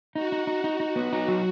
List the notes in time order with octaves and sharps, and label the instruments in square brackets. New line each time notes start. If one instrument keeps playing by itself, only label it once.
[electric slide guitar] D#4 [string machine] F#4
[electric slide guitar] D#4
D#4
[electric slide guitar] D#4 [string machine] F#4
[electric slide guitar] D#4
B3
D#4
F#3